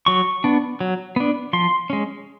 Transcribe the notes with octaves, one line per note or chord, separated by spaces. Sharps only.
F#3 C#6
B3 D4
F#3
B3 D4
F3 C6
G#3 C#4